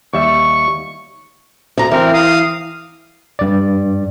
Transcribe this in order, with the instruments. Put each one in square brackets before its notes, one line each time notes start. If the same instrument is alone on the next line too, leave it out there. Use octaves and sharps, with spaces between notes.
[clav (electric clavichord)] D#2 G3 E5 [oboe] C#6
[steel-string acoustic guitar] D2 A#5
[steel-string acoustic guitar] E3 [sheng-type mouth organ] C4 A#4
[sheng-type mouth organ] F5 D#6
[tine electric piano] G2 D5